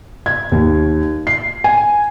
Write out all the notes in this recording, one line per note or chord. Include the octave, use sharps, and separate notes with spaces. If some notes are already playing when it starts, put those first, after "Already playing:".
G#6
D#2
C7
G#5